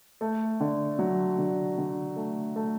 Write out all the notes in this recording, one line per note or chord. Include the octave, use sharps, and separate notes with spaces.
A3
D3
F#3
D3
D3
A3
A3